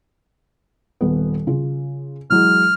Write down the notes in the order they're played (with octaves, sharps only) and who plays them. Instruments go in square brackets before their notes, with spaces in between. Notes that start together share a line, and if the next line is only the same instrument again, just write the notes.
[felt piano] D#1 B3
C#3 F4
[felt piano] E3 F#3 G#3 [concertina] F6